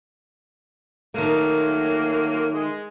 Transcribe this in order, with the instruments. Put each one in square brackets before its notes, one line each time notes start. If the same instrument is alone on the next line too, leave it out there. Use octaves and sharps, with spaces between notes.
[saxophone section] A#2 F#3 A#3 [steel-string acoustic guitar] D#3 A3
[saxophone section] G#3